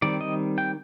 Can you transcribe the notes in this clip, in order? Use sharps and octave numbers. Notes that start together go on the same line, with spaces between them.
D#3 G3 C4 D5
D#5
G5